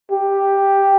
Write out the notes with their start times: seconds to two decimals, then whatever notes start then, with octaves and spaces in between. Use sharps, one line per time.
0.12 G4